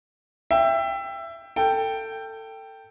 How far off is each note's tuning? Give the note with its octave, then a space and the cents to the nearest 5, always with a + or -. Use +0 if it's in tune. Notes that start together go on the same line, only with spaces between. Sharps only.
E5 +20 G5 +10
A4 +20 G5 +0